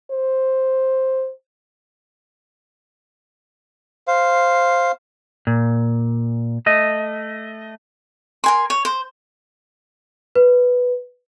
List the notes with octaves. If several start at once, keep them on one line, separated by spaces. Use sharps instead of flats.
C5
C5 F5
A#2
A3 D#5
A#4 G#5 C6
C#5
C5
B4